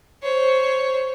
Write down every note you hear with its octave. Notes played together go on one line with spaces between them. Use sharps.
C5 C#5